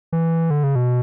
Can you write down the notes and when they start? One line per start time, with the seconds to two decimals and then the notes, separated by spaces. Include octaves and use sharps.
0.13 E3
0.51 D3
0.64 C#3
0.75 B2